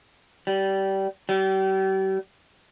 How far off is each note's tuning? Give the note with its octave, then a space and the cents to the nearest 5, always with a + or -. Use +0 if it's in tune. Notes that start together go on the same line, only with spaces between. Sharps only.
G3 -20
G3 -40